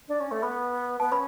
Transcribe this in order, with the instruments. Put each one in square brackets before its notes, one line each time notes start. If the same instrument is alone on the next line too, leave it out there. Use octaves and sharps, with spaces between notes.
[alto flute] D4
C#4
A3
[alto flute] B3 [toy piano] B5
[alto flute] B3 [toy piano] A5
[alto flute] C#4 [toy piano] B5